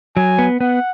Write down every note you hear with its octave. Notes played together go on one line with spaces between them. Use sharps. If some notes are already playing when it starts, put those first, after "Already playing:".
F#3 G#5
B3
B3 F#5